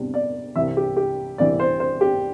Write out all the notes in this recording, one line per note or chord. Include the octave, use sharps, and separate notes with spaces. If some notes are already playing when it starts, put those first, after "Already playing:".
Already playing: E2 C3 G3 D4
D5
C2 C3 E3 E5
G4
G4
C2 C3 E3 D5
C5
C5
G4